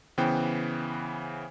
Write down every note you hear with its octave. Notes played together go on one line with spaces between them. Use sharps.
C#3 E3 B3 C5 G5